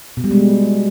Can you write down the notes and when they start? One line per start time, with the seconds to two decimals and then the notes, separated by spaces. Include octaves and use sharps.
0.17 B2
0.24 G3
0.31 G#3